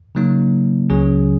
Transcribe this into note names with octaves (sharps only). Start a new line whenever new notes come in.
C#3 F#3 A#3 D#4
C#2 C#3 F#3 C#4 G#4